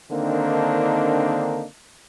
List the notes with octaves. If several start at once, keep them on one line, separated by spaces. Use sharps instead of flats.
D3 D#3 A#3 C4 D4 D#4